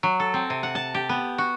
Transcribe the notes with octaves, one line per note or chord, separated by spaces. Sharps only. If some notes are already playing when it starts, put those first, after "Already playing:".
F#3
A4
C4
C3
F#5
A5
G4
B3
F#4